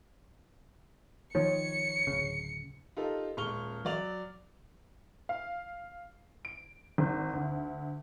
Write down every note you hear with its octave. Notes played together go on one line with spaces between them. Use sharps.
D#3 F3 C#5 C#7
D1 A#1 C#3
D#4 F4 G4 A4 A#4
D#1 G#3 C#6 F6 F7 G7
F#3 D5 F7
F5
D7
G#1
D2